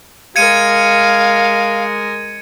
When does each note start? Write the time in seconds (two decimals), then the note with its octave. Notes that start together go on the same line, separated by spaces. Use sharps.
0.36 G#3 A#4 F5 G#6 C#7 D#7